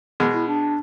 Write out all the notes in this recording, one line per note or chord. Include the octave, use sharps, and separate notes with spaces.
B2 G#3
E4
D4